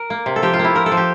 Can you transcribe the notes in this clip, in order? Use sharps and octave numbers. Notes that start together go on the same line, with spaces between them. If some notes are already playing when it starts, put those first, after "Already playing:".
Already playing: A#4
A#3
C3
A4
F3 G4
F4
A#3
E4
F3 A#4
A4
F3
G4